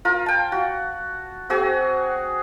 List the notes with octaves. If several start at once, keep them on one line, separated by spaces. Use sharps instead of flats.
F4 A#4
G5 A5
F#4
C4 F#4 G#4